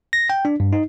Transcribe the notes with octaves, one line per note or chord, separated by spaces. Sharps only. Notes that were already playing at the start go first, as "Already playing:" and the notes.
A#6
G5
D4
G2
D#4